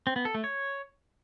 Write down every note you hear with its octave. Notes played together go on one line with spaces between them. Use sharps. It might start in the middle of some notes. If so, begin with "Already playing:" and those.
C4
B3
A4
A3
C#5